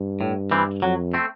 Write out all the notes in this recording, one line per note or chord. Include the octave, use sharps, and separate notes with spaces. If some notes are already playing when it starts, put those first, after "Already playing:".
Already playing: G2
A2
E3 G3 C4
F2 F#3
A3 C4